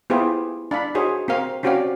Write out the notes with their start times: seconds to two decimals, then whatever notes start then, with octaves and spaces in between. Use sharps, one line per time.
0.10 B3 E4 F4 G4 G#4 C5
0.71 D4 F5 B5
0.95 D#4 F#4 G#4 C5 C#5
1.28 C4 A#4 F5
1.63 C4 C#4 F#4 G4 D5 F5